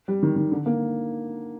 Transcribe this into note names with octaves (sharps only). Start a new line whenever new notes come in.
G3
D#3
D#3
D3
A#3